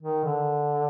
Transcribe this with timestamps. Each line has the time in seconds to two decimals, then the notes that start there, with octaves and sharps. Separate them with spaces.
0.03 D#3
0.24 D3